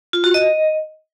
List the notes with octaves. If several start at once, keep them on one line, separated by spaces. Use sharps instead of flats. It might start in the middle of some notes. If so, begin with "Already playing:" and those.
F4
F#4
D#5